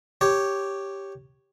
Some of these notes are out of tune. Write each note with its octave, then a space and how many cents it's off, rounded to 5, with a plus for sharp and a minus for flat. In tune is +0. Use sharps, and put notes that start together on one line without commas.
G4 +0 C#5 +0